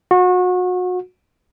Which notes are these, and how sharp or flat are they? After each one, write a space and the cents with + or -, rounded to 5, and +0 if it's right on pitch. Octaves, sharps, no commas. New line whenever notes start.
F#4 -30